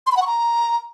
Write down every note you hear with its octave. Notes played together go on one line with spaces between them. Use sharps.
C6
B5
F#5
C#6
A#5